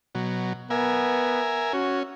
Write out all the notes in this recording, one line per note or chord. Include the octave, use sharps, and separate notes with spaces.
B2 F#3
B3 A#4 E5 G#5
C#4 F#4